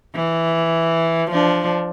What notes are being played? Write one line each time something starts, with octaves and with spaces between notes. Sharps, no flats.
E3
F3 D4